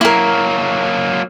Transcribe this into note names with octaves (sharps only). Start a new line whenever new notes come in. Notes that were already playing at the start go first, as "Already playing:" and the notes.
F#3 A#3 E4 A#4